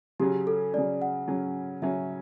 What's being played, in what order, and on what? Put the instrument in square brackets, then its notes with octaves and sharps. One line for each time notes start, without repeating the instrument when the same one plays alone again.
[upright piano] C#3 F#3 C#4 [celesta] G4
[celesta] A4
[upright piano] C#3 F#3 C#4 [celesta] D5
[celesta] F#5
[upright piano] C#3 F#3 C#4
[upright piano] C#3 F#3 C#4 [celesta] E5